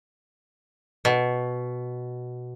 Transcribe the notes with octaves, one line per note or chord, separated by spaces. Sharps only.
B2